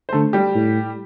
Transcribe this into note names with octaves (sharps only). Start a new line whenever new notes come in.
C5
D3 A3 A4
G3 G4
A2